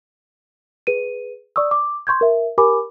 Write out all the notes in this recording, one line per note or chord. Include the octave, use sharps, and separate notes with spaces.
G#4 B4 D#7
D5 C#6 D#6 E6
D6
C6 C#6 G6 G#6
A#4 E5
G4 A#4 G#5 B5 D6